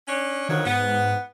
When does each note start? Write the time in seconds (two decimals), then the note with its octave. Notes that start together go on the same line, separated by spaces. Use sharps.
0.07 C#4 D4 C#5
0.49 D2 D#3 F3 F#3
0.65 G#2 B3